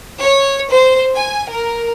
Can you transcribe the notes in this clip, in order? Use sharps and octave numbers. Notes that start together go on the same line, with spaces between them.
C#5
C5
G#5
A#4